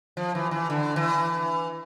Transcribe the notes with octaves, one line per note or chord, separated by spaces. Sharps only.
F3
E3
E3
D3
E3